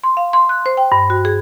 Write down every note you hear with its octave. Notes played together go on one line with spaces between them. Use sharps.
C6
F5
C6
F#6
C5
G5
G2
F#4
G#4